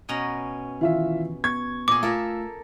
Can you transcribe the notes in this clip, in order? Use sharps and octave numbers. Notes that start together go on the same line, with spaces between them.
B2 C#4 A#5
D#3 E3 E4 F4 E5
B3 C#6 G#6
A#2 G#4 D6
A3 F4 A4 A#4 E5